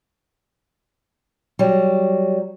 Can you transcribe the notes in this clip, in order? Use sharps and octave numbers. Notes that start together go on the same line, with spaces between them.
F#3 G3